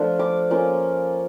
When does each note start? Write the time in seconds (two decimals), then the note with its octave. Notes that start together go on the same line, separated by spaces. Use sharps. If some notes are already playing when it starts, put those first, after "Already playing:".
Already playing: F3 A3 D4 F4
0.19 D6
0.51 A#3 C#4 F4